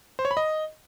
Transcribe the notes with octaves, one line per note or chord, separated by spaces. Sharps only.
C5
C#5
B5
D#5